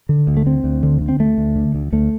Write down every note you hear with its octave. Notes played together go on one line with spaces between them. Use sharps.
D3
D2
A3
D2 C4
D2
D3
D3
C4
D2 A3
D2
D3
D2
D2 A3